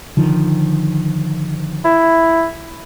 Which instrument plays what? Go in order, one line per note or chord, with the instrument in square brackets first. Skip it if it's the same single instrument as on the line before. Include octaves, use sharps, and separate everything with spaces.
[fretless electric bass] D3 D#3 F3
[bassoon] E4